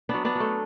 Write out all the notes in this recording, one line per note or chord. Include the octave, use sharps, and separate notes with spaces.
F#3 B3 D4
B3 D4
F#3 A3